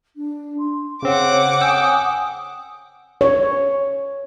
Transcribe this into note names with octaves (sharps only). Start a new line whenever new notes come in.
D4
C6
C#3 C4 C#5 F#5 D6
G5 G#5 D#6 E6
C#5